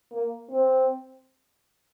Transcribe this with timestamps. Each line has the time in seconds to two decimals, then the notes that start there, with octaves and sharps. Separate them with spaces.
0.12 A#3
0.50 C4